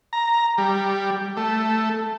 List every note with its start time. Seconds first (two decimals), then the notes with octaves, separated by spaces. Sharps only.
0.13 A#5
0.58 G3
1.37 A3